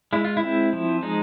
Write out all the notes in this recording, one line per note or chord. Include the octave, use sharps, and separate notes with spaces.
G#3 E4
F4
E4
C4
F3
G#3 D#4